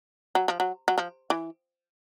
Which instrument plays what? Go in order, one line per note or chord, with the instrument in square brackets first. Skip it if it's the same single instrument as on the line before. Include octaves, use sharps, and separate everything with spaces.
[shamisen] F#3
F3
F#3
F#3
F3
E3